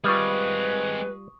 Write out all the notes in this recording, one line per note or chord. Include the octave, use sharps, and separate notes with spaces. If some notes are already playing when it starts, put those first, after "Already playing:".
G3 G#3 C4 F4 B4 C#6 D#6